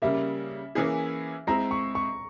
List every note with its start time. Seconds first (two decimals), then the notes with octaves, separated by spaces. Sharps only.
0.02 C#3 G3 A#3 E5
0.75 E3 A#3 C#4 E4 G#4
1.47 G#3 C4 E4 A#5
1.71 C#6
1.95 C#6